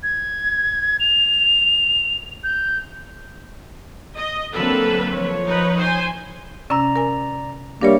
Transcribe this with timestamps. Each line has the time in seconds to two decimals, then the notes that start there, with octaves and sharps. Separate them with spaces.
0.03 G#6
1.00 F7
2.44 G6
4.17 D#5
4.54 D3 F#3 A#3 C4 A4 B4
5.10 F3 C#5
5.46 D#4 B4
5.79 C5 G#5
6.70 C3 C#4 D5 A#5 E6
6.96 A#4 G#5
7.81 G3 A3 A#3 D4 A#4 C#5